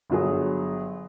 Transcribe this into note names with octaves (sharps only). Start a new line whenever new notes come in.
G1 F#3 G#4